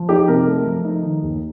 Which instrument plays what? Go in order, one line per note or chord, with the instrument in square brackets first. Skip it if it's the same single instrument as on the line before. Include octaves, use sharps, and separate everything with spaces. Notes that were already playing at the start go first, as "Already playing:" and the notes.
Already playing: [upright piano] F3
D#4 G4
C3 A#4
A3
F3
D#4
D#3
D#2